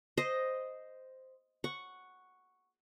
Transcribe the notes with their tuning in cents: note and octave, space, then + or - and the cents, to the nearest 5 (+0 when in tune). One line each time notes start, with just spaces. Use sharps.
C5 -5 D#5 +0
F#5 +0 C#6 +0